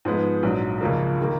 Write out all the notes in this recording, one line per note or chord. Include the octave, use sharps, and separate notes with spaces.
G#2 F3 G#3 B3
A#1 G#2 F#3
C#2 C#3 F3 A#3
D#3 A#3